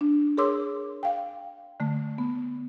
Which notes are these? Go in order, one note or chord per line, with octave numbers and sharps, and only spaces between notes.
D4
G#4 A#4 C#5 C6 D6 E6
F5 G5
D3 A3
B3